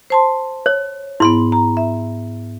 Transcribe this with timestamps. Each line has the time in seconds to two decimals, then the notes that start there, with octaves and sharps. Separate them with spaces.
0.10 C5 A5 C6
0.66 C#5
1.20 G#2 B3 E4 C6
1.52 A#5
1.77 E5